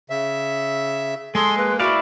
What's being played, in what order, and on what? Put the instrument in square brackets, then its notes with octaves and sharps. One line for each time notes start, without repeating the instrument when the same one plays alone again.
[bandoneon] C#3 E5
[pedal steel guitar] G#3 [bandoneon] G#4 A4 [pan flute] C6
[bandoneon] A#3 [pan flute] B4
[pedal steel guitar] E4 D5 F5 [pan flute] F#4